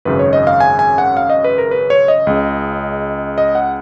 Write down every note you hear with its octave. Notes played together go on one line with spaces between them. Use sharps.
G#1 F#2 C#3 B4
C#5
D#5
F5
G#5
G#5
F#5
F5
D#5
B4
A#4
B4
C#5
D#5
C#2 C#3
D#5
F#5